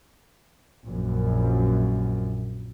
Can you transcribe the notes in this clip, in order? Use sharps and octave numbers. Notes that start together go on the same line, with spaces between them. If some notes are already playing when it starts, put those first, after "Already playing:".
A#1 F#2